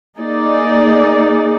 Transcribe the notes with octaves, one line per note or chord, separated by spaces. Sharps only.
A#3 D#4 G#4 D5